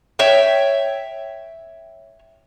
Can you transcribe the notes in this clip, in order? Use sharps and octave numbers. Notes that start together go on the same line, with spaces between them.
C#5 E5 G5